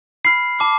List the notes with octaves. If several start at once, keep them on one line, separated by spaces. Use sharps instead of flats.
B5 F6 C7
A5 D6 F6